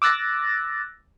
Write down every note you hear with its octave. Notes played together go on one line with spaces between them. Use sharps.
D6 E6 F#6 A6 A#6